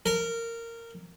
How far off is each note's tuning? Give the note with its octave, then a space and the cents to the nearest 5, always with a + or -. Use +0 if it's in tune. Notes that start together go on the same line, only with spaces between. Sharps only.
A#4 -15